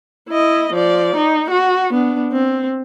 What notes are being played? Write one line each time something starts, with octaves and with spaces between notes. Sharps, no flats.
E4 D#5
F3 D5
D#4
F#4
B3 D4
C4